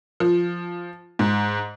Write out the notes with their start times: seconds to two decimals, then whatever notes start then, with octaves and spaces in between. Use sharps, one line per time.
0.20 F3
1.19 G#2